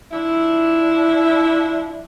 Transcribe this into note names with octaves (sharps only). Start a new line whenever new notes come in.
F3 D4 E4